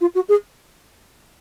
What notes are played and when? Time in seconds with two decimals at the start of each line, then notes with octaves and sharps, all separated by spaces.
0.01 F4
0.15 F#4
0.29 G#4